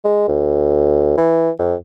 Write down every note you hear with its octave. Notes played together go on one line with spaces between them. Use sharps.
G#3
D2
E3
F2